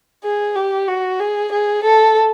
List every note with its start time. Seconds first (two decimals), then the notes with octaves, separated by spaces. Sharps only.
0.24 G#4
0.56 G4
0.88 F#4
1.20 G#4
1.52 G#4
1.84 A4